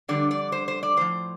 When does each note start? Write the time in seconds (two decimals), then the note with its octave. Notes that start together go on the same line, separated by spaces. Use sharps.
0.08 F2 D3 G3 D5
0.31 D5
0.52 C5
0.68 C5
0.83 D5
0.97 A2 F3 C5